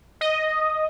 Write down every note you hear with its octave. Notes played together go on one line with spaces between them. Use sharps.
D#5